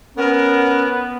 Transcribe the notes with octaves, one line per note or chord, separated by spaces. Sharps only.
B3 C#4 A#4